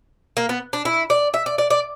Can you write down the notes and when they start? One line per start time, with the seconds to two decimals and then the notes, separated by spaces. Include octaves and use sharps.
0.37 A#3
0.49 B3
0.73 D4
0.85 E4
1.10 D5
1.34 E5
1.46 D5
1.58 D5
1.70 D5